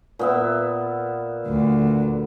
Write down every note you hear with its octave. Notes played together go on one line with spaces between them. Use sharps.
A#2 B3 E5
D2